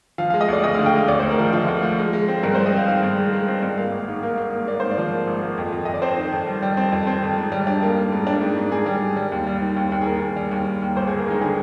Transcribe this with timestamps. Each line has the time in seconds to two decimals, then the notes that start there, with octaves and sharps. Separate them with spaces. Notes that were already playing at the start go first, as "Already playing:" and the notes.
0.18 F3 F5
0.30 F5
0.34 G#3
0.41 D#5
0.49 D2 D5
0.63 D2 D#5
0.75 F5
0.78 D3
0.86 G5
0.94 G#3 F5
1.08 D2 D5
1.19 C5
1.23 D2
1.31 A#4
1.39 F3
1.53 F3 F4
1.68 D2
1.83 F3
1.99 G#3
2.13 G#3
2.28 C4
2.43 G2 A#4
2.55 C5
2.58 G#3
2.66 D#5
2.73 C4 F5
2.88 D#3 F5
3.03 G2
3.18 G#3
3.33 G#3
3.48 C4
3.63 G2
3.78 A#3 F5
3.92 G#1
4.08 G#2
4.23 A#3
4.37 A#3
4.53 A#3
4.67 A#3 D5
4.80 G#2 C5
4.91 D5
4.98 F3
5.13 A#3
5.28 G#1
5.42 A#3
5.58 F2
5.72 F2
5.85 F2 D#5
5.94 D5
6.02 C4 C5
6.17 D#3
6.32 F2
6.47 G3
6.63 G3
6.77 C4
6.92 F2
7.07 C4
7.23 F2
7.37 G#2
7.52 G3
7.67 D4
7.82 A#3
7.97 G#2
8.12 G#2
8.27 D4
8.42 G#2
8.56 G#2
8.72 G#2 G#4
8.86 G3
9.02 G#2
9.17 G3
9.32 D#2
9.47 G3
9.62 D#3
9.77 D#2
9.92 D#2
10.01 G#4
10.06 D#3 A#4
10.21 D#2
10.36 G3
10.51 D#2
10.66 D#2
10.82 D#2
10.96 G1 C5
11.07 G#4
11.12 G1
11.18 A#4
11.26 G#3 D#4
11.41 D3 G#4